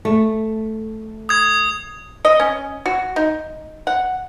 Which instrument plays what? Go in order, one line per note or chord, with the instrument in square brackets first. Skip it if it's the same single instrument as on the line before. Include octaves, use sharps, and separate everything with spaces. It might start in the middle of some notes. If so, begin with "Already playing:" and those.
[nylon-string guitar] A3
[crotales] D#6 G#6
[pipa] D#5
C#4
F#4
D#4
F#5